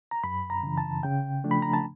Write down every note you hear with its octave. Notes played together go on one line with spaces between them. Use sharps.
A#5
F#2 B5
A#5
C#3 E3
A5
C#3 G5
F3 A3 D4
B5
A#5
A5